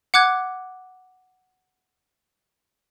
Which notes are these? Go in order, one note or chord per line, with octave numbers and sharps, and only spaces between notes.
F#5 D6 F#6 G#6